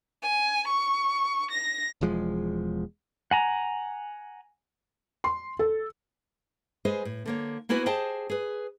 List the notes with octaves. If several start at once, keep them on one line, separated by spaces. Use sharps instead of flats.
G#5
C#6
A#6
E1 E2 F3 G#3
F#5 G#5 A#5
C6
A4
G#3 G#4 B4 C5 D#5
A2
D3 A#3 C#5
A#3 B3 E4 F#4 B4 G#5
G4 G#4 C5 D#5 G5 A5
G#4 B4